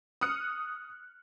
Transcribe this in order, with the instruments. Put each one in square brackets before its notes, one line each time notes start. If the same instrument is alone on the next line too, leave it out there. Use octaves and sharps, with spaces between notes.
[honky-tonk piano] D#6 F6 F#6 C#7